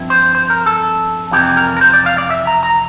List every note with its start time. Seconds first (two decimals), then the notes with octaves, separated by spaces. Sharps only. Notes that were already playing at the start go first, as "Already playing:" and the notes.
Already playing: G2 F3 C4 E4
0.10 C5
0.35 C5
0.50 A#4
0.66 A4
1.31 F2 C3 E3 G4
1.57 A#4
1.77 A#4
1.81 C5
1.93 D5
2.06 F5
2.18 D5
2.31 E5
2.47 A#5
2.63 A#5